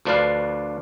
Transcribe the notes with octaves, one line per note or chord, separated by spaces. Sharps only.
D2 F3 D4 B4 D5 F5